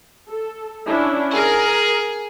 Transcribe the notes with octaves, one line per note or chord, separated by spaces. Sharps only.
A4
C#4 D4 E4
G#4 A#4